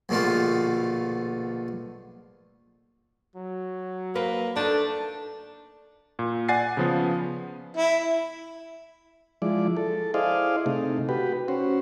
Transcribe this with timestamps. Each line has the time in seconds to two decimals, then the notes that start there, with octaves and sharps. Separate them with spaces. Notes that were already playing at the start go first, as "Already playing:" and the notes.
0.09 A#1 B2 D3 A3 F4
3.36 F#3
4.16 A#3 B4
4.56 A3 D4 D#4 A5
6.19 A#2
6.49 D5 F#5 G#5 A6 C7
6.77 C#3 F3 B3
7.77 E4
9.42 F3 G#3 E4 D5
9.77 A4
10.14 E4 G#4 C5 D5 D#5 F5
10.66 C3 A3 D#4
11.09 F#4 G4 B4
11.48 C#4 F#4 C5